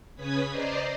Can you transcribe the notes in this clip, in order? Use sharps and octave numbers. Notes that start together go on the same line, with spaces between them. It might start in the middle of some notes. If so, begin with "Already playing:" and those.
C#3 C#4 B4 D#6 G#6 B6
C5 D5 D#5 A#5 C6